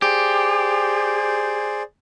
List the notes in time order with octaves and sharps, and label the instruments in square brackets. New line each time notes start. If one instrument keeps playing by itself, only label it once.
[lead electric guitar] G4 [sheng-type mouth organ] G#4 C5 D5